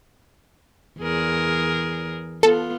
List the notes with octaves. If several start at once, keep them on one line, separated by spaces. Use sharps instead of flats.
E2 G#4 A#4
B3 F4 A4